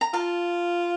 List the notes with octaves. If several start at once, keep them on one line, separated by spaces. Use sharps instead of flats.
A#5
F4 F5 A5